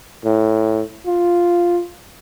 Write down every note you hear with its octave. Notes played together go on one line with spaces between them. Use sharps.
A2
F4